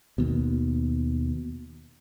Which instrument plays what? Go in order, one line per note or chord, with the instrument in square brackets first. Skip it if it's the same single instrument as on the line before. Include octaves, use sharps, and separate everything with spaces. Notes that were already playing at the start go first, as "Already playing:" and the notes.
[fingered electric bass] D#2 B2